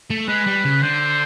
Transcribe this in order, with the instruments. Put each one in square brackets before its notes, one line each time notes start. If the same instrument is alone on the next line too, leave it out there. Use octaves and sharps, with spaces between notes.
[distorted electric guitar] A3
[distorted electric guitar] G#3 [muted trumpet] B4
[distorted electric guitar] G3
C#3
[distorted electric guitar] D3 [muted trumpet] C5